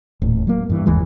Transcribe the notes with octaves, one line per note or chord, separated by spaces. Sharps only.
D#1 A2
F#3 A#3
G2 E3
F1 D#2 E3 G#3